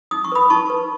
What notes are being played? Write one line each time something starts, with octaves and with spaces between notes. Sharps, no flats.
D#4 D#6
C#6
B4 B5 D#6
D#4 A5 C#6
B4